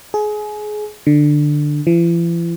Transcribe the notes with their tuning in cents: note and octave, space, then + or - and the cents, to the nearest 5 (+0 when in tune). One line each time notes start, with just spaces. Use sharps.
G#4 +25
D3 +15
E3 +45